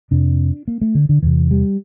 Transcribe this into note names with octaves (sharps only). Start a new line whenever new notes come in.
F2 C3 D4
A#3
A3
D3
D3
E2 C3 E3
G3